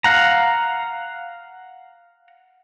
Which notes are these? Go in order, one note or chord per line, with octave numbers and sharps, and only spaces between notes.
F5 F#5 A#5